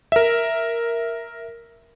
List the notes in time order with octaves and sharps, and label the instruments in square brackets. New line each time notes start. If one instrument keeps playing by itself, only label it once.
[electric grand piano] A#4 E5